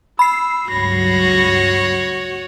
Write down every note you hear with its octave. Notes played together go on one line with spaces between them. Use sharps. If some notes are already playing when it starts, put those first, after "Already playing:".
B5 E6 C7
C#2 G2 F#3 F#4 C#5 A#6